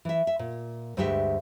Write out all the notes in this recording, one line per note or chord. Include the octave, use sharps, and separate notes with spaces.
E3 E5
E5
A#2
D2 G2 G#3 D4 G4 E5